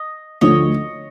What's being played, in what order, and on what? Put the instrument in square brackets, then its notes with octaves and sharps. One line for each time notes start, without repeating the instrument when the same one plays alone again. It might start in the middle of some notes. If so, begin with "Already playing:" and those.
Already playing: [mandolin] D#5
[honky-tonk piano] D2 D3 F3 [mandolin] C#5 D#5